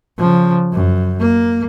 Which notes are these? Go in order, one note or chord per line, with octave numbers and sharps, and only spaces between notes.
C#3 F3
F#2
A#3